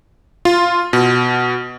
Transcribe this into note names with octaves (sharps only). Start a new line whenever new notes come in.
F4
B2